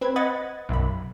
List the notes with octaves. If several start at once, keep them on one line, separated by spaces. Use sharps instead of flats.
C4 B4 G#6
D#5 F#5 B5 G#6 A6
B1 F#2 B5